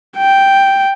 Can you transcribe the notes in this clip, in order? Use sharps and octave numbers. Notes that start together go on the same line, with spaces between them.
G5